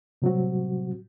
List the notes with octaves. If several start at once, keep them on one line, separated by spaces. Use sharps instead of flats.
A2 C3 F#3 G3 C4 F#4